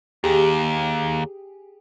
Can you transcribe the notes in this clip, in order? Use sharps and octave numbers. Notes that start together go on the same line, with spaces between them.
D#2 G4 G#4